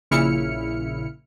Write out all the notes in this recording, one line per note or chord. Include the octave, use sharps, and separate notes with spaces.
A#1 A#2 C#3 E4 F6 C#7